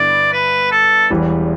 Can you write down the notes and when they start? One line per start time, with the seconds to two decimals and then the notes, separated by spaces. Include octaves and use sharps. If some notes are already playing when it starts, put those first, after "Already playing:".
Already playing: G2 D3 B3 E4 D5
0.32 B4
0.71 A4
1.10 E1 E2 E3 G3